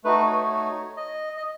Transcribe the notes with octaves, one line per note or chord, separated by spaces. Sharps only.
A3 D#4 F#4 B4
C#5
C#5
D#5
D#5